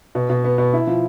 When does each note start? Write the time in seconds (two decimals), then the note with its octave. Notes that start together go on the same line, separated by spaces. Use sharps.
0.15 B2
0.29 B2
0.44 B3
0.58 B2
0.73 E4
0.87 F3